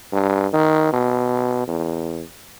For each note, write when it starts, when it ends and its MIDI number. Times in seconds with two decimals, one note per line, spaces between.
0.13 0.47 43
0.53 0.90 51
0.93 1.67 47
1.68 2.23 40